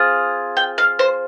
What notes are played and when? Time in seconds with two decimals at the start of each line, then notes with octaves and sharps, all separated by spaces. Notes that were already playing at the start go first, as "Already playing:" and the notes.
Already playing: C4 F4 G#4
0.57 G5
0.78 F5
0.99 C5